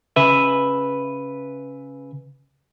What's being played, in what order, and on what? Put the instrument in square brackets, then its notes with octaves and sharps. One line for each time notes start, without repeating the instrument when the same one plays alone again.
[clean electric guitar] C#3 B4 E5